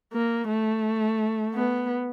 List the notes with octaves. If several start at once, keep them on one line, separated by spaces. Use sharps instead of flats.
A#3
A3
B3